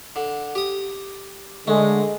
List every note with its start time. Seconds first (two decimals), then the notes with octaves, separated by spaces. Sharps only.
0.16 D3
0.55 G4 D#6
1.68 D3 G#3 A3